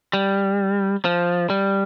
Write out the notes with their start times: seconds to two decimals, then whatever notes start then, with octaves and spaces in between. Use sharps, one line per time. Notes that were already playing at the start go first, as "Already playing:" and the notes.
0.13 G3
1.05 F3
1.50 G3